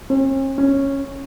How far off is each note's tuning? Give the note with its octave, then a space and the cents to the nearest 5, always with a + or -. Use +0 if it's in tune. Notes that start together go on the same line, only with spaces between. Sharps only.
C#4 -45
C#4 -10